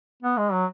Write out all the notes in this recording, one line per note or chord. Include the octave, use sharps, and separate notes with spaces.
B3
G#3
F#3